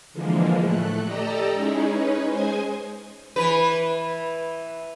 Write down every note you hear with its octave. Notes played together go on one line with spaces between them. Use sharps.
D3 E3 F3 G#3 A#3
A2 A3 F#6
G4 A4 D5 D#5 A#5 E6
G#3 C#4 D#4 E4 G#4
C#4 D#4 B4 C#5
G#3 C5 D#5 G#5 G#6
E3 B4